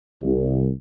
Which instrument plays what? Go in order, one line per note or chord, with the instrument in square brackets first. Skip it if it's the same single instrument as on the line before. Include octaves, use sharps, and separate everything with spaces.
[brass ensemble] C2